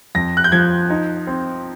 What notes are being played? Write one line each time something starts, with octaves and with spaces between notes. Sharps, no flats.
F2 A#6
F#6
G6
F3 G#6
D#4
C4